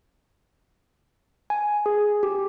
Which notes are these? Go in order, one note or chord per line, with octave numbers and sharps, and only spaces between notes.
G#5
G#4
G4